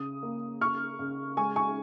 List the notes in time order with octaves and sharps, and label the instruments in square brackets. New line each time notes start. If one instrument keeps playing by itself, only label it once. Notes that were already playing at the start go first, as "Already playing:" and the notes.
Already playing: [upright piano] C#3 D#6
A#3
C#3 C#6 F6
C#3
G#3 G#5 C#6
G#5 C#6